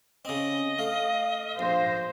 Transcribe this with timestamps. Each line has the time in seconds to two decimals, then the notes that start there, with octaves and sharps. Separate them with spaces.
0.25 C#3 C4 D#5
0.79 A3 F5
1.59 A#1 C5 A#6